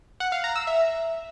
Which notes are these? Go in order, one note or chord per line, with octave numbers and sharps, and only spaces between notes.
F#5
F5
A#5
E6
E5